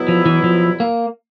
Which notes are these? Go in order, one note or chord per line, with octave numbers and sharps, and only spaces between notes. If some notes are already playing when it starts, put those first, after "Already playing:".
Already playing: E2 B2 F#3 B3 E4
F3
E3
F3
A#3